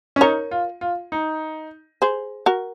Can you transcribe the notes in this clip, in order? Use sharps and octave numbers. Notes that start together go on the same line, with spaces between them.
C#4
D#4 A#4 C#5
F4
F4
D#4
G#4 C5
F#4 A#4